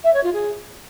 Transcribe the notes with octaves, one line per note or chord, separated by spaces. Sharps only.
E5
C#5
F4
G#4